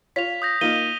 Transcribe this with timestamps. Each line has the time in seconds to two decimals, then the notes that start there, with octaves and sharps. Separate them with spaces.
0.16 F4 C#5 B6 F7
0.42 D#6 G6 A#6
0.61 A#3 D#4 F4 D#7 G7